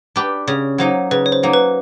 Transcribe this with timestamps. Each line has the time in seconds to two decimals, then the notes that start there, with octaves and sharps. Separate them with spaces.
0.16 D4 G4 B4
0.47 C#3 C#5
0.78 F#3 A#3 D#4 C5
1.11 C#3 B4
1.26 C#5
1.32 C5
1.43 F#3 A#3 D#4
1.53 B4